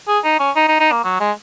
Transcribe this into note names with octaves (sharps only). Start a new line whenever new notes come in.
G#4
D#4
C#4
D#4
D#4
D#4
A#3
F#3
G#3